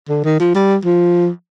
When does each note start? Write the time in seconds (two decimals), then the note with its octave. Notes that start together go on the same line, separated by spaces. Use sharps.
0.09 D3
0.24 D#3
0.40 F3
0.55 G3
0.85 F3